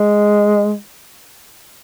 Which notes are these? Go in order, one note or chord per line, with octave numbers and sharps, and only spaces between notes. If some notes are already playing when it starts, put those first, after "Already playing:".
Already playing: G#3